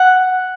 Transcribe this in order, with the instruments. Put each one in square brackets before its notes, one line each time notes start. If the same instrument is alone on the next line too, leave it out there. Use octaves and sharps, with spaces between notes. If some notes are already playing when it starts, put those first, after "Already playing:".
Already playing: [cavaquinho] F#5